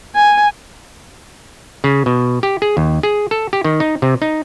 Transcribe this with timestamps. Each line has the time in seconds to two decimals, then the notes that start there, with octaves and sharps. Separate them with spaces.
0.15 G#5
1.84 C#3
2.06 B2
2.43 G4
2.62 G#4
2.77 D#2
3.03 G#4
3.31 A4
3.53 G4
3.64 D#3
3.80 D#4
4.02 C3
4.22 D#4